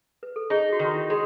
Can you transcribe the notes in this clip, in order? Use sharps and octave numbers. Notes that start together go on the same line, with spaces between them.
B4
A4
D#4 G#4
F#4
D#3
F#4
E4
G#3